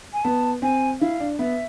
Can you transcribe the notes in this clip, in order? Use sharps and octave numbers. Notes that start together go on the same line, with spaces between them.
G#5
B3 A5
C4 G#5
E4 F5
D4
B3 E5